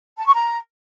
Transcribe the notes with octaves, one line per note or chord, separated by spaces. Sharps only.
A5
C#6
A#5